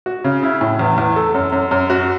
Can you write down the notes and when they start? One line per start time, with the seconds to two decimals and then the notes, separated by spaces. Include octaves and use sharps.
0.06 F#4
0.24 C#3
0.43 E4
0.61 A2
0.79 E2
0.98 E2
1.16 A4
1.34 F#2
1.52 F#2
1.71 F#2
1.90 F#4